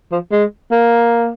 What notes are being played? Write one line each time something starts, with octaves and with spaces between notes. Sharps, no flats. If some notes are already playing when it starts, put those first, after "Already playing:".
F3
G#3
A#3